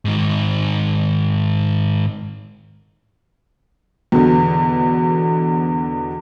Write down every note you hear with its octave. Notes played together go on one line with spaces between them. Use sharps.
G#2 D#3
E2 B2 D3